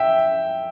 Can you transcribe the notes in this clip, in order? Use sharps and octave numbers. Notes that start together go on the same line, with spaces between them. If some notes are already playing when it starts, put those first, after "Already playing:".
Already playing: E5 G5